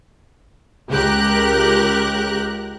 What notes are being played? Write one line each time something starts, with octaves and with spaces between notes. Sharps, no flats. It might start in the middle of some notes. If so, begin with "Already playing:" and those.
C#2 G4 A#4 F#6